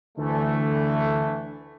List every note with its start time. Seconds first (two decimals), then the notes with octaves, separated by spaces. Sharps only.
0.18 D2 D3 E3 A3